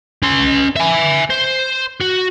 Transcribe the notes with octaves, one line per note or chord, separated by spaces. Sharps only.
C#4 C6
E5 G#5
C5
F#4